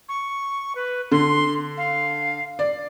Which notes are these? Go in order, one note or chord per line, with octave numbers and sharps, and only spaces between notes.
C#6
B4
D3 C6
F5
D5